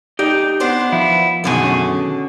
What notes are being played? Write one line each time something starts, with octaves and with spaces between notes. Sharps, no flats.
D2 D#4 G4 D5
B3 D4 C5
F3 E4
F#2 B2 D3 D#3 G#4 A4
C#4